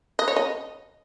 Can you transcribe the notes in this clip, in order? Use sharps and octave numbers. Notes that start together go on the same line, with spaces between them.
D#5
C#5
D#5